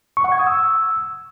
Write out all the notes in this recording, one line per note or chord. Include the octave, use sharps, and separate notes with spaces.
C#6
F#5
G#6
D#6
E6